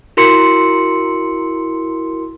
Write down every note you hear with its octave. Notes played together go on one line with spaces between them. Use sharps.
E4 F#4 A#4 C6 C#7